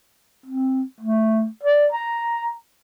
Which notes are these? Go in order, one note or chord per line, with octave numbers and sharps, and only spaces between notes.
C4
A3
D5
A#5